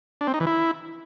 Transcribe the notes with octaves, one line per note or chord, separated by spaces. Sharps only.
D4
C4
D#4
E3
E4